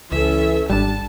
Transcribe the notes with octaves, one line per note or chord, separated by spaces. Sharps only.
C#2 E3 C#4 A4 E5
G#1 G3 D4 G4 A5